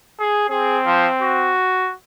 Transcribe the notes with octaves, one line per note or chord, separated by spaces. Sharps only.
G#4
C4 G#4
F3
F#4